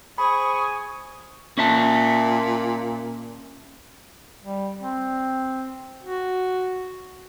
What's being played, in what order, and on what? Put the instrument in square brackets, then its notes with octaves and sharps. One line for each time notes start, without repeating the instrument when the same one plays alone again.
[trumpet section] G#4 G#5 [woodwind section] C5 C#6 [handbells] B5 [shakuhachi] D#6
[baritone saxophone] A#2 [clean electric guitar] C#4 E5 A5
[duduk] G3
C4
F#4